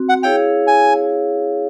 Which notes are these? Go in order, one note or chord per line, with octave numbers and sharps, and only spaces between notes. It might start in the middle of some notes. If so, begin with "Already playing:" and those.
Already playing: C4 F#4
F#5
E4 G#4 C#5 F5 G5
G#5